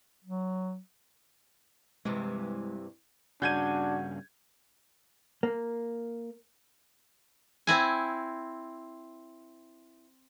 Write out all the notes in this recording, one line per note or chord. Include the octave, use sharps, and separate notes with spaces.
F#3
G2 C3 E3 G#3
G2 C#3 D4 F#4 G6 G#6 D#7
A#3
C4 E4 G#5